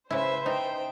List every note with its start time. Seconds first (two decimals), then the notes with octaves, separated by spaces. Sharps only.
0.10 C#3 E4 B4 C5 E5
0.46 D#4 G5